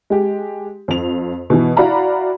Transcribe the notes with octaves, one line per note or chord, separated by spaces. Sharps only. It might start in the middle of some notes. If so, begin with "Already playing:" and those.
G#3 G4
F2 F7
B2 E3
E4 F#4 D5 F5 A#5 B5